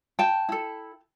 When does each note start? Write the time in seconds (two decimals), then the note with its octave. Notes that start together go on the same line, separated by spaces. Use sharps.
0.19 G5 A5
0.49 E4 A4